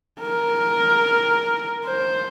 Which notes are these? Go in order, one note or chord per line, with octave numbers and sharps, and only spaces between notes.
A#4
C5